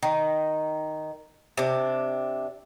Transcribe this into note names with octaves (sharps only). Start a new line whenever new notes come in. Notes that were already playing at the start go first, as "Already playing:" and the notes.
D#3
C3 D4